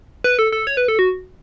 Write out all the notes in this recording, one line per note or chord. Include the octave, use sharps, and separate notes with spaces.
B4
A4
A4
C#5
B4
A4
F#4